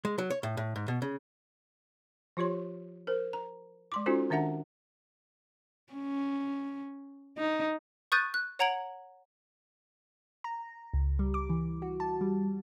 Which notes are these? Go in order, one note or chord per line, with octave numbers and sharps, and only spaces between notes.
G#3
F#3
C#5
A2
A2
G#2
B2
C#3
F3 F4 G4 C#5 C6
A#4 C5
A#5
G#3 C6 D6
C#4 D#4 F4 F#4 A4 C5
D#3 D4 E5 F#5 A#5
C#4
D#4
C#6 D#6 F#6 G6 A6 D#7
F#6
C#5 F#5 A#5 G#6 D7 F#7
A#5
C#2
G3
D6
E3
F#4
A5
G3